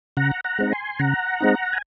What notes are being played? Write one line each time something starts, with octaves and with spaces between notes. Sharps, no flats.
C#3 F#5 A#5
F#5 A#5
G#3 C4 D#4
G#5 C6
C#3 F#5 A#5
G#3 C4 D#4
G#5